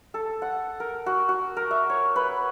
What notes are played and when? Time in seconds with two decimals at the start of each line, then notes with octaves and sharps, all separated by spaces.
0.14 A4
0.42 F#5
0.80 A#4
1.06 F#4
1.29 F#4
1.57 A#4
1.71 E5
1.90 C#5
2.16 B4